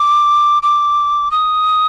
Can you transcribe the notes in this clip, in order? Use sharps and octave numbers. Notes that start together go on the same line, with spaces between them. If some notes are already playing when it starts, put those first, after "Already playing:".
Already playing: D6
D6
D#6